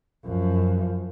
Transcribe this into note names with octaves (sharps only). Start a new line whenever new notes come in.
F#2 F3